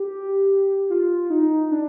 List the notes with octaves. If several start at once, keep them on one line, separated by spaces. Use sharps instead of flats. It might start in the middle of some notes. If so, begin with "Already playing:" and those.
Already playing: G4
F4
D#4
D4